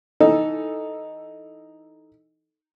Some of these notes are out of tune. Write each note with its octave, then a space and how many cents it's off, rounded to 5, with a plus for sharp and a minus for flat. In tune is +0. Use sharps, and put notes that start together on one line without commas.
E3 -5 D#4 +0 A4 +0